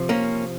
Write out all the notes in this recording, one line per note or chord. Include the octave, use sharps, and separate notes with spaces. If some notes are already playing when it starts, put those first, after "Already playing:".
Already playing: C3 F3
A#3 C#4